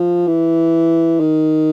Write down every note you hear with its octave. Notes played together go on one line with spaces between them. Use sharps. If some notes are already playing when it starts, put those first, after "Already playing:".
Already playing: F3
E3
D#3